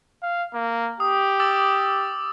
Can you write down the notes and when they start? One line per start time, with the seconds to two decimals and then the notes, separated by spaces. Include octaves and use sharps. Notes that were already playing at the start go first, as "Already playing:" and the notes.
0.22 F5
0.54 A#3
1.00 G4 D#6
1.40 D6 E6 A6